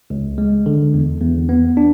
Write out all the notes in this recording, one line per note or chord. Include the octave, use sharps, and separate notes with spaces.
C#2
G#3
D3
E2
E2
B3
D4